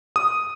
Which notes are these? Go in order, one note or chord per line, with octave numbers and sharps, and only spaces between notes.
D#6